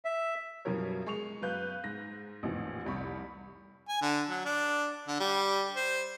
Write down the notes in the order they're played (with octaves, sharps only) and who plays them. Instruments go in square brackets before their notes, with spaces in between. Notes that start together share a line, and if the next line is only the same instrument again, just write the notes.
[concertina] E5
[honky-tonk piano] F#2 B2 F3 G3 A#4 C#5
G#3 C#6 F7
F#2 B3 B4 F5 F#6 G6
G#2 A#6
A1 F2 A#2 D#3 E3
F1 C2 B5 C#6
[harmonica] G#5
D3
F#3
D4
D3
G3
C5